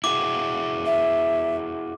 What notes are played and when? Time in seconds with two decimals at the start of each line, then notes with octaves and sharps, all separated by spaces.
0.04 E4 F#4 G#4 D6
0.86 E5